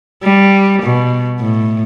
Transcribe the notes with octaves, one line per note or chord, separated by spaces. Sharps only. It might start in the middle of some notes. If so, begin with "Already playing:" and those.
G3
B2
A2